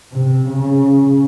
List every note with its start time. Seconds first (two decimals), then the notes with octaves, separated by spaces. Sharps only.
0.13 C3
0.48 C#3